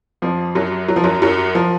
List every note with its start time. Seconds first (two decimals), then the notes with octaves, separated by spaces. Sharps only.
0.22 F2 F3
0.55 F#2 F#3
0.88 F#3
0.96 F3
1.04 F#2 F#3
1.22 F#2 F#3
1.55 F3